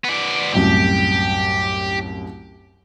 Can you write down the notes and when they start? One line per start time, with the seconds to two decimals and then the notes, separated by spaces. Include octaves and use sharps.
0.04 B3 D5
0.53 C2 F#2 A2 G4